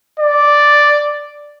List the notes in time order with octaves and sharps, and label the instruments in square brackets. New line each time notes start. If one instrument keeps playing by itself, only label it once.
[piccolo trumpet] D5